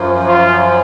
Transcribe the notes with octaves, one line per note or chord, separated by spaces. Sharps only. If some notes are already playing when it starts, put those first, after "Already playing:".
Already playing: F#2 F3
F4